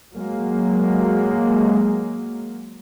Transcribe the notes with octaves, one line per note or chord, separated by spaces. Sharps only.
F#3 G#3 A#3